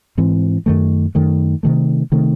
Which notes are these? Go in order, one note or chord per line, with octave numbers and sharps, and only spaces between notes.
G#2 E3 C4
F#2 D#3 A3
F#2 D#3 A3
C3 D#3 A3
C3 D#3 A3